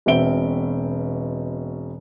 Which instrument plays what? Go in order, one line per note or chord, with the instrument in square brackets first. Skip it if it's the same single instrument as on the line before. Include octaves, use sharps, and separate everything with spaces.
[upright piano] E1 B2 C4 E5 D7 G7